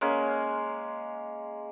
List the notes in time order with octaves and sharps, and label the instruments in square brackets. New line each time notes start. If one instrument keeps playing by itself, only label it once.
[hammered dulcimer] G#3 A#3 C#4